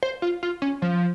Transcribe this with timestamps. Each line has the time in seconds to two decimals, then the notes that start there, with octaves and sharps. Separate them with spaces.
0.03 C5
0.22 F4
0.43 F4
0.62 C#4
0.82 F3